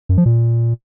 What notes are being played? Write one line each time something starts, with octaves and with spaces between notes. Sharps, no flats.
F#2
F3
A#2